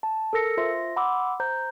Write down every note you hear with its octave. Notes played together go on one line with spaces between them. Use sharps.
A5
A4 A#4 E6 A#6 C#7
F4 C5 E5 C6 A#6
F#5 B5 C6 D6 E6
C5 A#5 G6